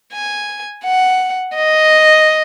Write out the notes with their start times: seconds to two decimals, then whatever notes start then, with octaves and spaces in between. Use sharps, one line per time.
0.13 G#5
0.84 F#5
1.55 D#5